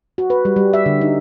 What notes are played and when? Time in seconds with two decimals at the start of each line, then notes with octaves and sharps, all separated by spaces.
0.18 F#4
0.30 B4
0.45 G3
0.56 G3
0.74 E5
0.86 D3
1.01 D#4